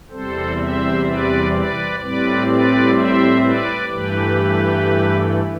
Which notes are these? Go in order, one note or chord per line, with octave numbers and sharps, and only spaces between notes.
E2 C3 G3 C4 A4 C5
C5 E5
B4 D5
B4 D5
A2 G3 C4 B4 D5
B4 D5
C5 E5
B4 D5
G2 E3 A3 G4 B4